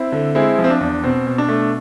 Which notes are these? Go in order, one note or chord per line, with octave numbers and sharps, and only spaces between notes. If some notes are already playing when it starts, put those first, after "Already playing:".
Already playing: C4 E4
D3
G#3 C4 E4
F3
C4
D4
E2
B2 C4
B2
D4
A3